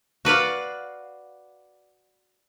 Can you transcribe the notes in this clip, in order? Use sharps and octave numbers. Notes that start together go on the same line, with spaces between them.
F#4 B4 D5 F5